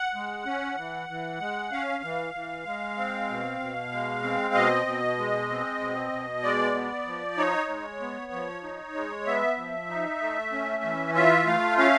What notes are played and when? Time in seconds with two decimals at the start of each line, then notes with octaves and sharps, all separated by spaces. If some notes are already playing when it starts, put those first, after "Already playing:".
Already playing: F#5
0.15 G#3
0.46 C#4
0.77 E3
1.09 E3
1.40 G#3
1.72 C#4 F5
2.04 E3
2.34 E3
2.66 G#3
2.97 C4
3.29 B2
3.60 B2
3.92 G#3
4.24 C4
4.54 B2 D#5
4.86 B2
5.18 G#3
5.49 C4
5.81 B2
6.12 B2
6.43 G#3 D5
6.75 B3
7.07 F3
7.38 D#4 C#5
7.69 G#3
8.01 B3
8.32 F3
8.64 D#4
8.95 G#3
9.27 B3 E5
9.57 F3
9.90 D#4
10.21 A3
10.52 C#4
10.83 E3
11.15 F4 E5
11.47 A3 F5
11.78 C#4 F5